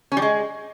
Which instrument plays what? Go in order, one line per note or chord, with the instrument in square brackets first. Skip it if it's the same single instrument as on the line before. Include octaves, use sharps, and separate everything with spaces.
[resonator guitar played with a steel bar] C#4
G3
G#3